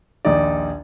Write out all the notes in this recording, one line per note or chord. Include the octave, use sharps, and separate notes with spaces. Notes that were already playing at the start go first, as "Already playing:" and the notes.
A#1 D#2 D#4 D5